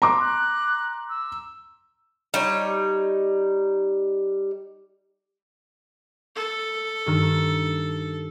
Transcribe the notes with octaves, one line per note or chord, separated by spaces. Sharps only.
A#5 C6 D6
F#6
E6
G3 D#4 C#5
A4
G2 D#3 E6